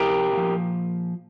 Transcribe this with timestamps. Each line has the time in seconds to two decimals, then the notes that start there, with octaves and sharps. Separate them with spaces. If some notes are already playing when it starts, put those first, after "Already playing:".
Already playing: F2 C3 G4 A#4
0.32 A#2 F3